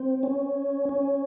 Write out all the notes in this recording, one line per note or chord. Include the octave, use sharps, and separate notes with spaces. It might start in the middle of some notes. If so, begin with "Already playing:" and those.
Already playing: C4
C#4
C#4